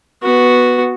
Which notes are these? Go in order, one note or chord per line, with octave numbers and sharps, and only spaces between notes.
B3 F#4